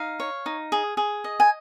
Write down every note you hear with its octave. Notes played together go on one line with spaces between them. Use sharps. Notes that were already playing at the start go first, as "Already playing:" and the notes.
Already playing: D#4 F5
C#5
D#4
G#4
G#4
D#5
G#5